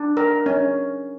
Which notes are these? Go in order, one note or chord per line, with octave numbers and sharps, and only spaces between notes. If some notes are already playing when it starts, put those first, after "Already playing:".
Already playing: D4
A#4
C#4